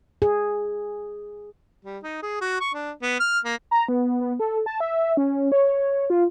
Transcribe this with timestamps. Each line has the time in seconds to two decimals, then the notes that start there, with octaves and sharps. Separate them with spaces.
0.22 G#4
1.85 G3
2.03 D#4
2.23 G#4
2.41 F#4
2.60 C#6
2.74 D4
3.02 B3
3.20 F6
3.45 A#3
3.71 A#5
3.88 B3
4.20 B3
4.39 A4
4.66 A5
4.80 E5
5.17 C#4
5.52 C#5
6.10 F4